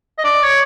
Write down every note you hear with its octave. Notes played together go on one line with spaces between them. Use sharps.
D#5
D5
C#5